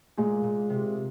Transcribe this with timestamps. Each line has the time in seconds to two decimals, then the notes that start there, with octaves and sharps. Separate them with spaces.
0.17 A#2 G#3 G#4
0.43 A#2
0.70 C3